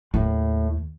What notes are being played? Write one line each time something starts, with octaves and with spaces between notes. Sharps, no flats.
D#2 A2